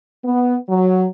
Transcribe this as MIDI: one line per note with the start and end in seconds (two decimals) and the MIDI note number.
0.25 0.56 59
0.69 1.06 54